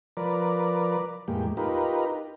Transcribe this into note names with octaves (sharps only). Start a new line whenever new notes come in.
F3 A#4 B4 D5
E2 A2 G#3 A#3 G4
D#4 F4 G4 A#4 B4